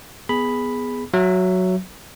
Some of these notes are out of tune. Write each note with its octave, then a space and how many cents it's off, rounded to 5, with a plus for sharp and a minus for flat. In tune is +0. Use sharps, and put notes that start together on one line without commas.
B3 +0 G#4 +0 B5 +0
F#3 +0 E5 +20